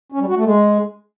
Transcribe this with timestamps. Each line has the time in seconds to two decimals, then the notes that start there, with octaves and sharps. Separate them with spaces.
0.12 C#4
0.20 G3
0.28 F#4
0.36 A3
0.45 G#3